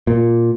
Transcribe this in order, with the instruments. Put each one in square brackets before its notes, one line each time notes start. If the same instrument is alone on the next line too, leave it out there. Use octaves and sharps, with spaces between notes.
[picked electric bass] A#2